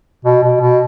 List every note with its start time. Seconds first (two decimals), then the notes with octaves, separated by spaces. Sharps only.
0.25 B2
0.43 B2
0.60 B2